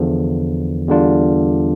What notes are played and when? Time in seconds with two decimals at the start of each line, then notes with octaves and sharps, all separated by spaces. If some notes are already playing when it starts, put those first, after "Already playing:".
Already playing: E2 D3 F3
0.88 E2 D3 G3 D4 F4